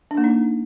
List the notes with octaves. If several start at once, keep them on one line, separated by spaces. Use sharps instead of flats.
D4
A#3
D#4